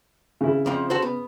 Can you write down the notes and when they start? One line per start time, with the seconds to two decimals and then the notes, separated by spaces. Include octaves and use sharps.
0.41 C#3 E4
0.66 F2 F3
0.90 F#4 A4 C5
1.02 B3